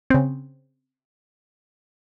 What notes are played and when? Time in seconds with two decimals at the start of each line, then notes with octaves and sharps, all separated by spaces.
0.10 C#3 C4